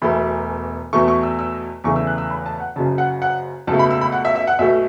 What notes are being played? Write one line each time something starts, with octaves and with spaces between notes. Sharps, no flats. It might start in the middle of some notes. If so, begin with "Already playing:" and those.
E1 E2 B2 A3 B5
E2 B2 A3 C#6
C#6
E6
E6
E2 C#3 E3 A3 C#6
E6
F#6
E6
B5
A5
F#5
F#1 F#2 C#3 A5
F#5
F#5
C#2 B2 A3 A5
B5
E6
B5
F#5
E5
E5
F#5
B1 B2 A3 E5